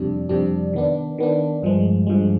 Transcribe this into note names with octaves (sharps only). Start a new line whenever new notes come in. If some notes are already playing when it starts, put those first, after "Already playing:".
Already playing: F2 C3 G3 D4
F2 C3 G3 D4
D#3 B3 D4
D#3 B3 D4
G2 F3 G#3
G2 F3 G#3